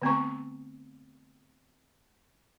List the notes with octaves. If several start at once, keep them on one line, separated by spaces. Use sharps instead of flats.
D3 A3 B3 C4 A#5 C#6